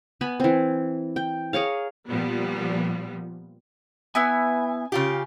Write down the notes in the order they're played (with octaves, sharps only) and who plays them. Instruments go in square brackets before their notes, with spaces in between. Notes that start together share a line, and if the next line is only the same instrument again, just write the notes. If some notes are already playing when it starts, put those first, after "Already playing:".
[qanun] B3 G#5 B5
E3 C4
G5
G#4 A#4 C#5 F5
[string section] A#2 F3 G3 B3
[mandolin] B3 E4 E6 [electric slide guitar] G#5
[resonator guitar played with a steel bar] C#3 F4 G4